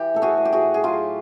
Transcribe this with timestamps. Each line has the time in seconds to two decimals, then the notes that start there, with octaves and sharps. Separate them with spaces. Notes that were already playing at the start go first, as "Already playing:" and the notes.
Already playing: E3 G4
0.14 A2 A4
0.22 F#4 G#4
0.37 A2
0.45 G4
0.52 F#4 G#4
0.61 A2
0.74 G#4
0.83 F#3 F4 G4